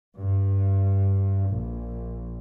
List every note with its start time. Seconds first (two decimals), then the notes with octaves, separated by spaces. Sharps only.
0.17 G2
1.50 A#1